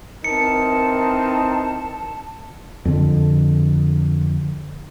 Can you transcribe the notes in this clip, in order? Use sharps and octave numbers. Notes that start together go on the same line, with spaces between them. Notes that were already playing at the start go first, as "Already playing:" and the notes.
E3 C4 D#4 A#4 A5 C#7
F2 D3